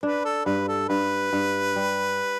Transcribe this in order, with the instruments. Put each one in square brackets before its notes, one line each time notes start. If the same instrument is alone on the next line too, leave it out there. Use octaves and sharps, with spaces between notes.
[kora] D4 [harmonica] B4
[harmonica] A4
[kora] G2 [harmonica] B4
[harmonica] A4
[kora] G2 [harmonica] B4
[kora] G2
G3